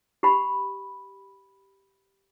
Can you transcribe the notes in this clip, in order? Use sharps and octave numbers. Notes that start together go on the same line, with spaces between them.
G4 B5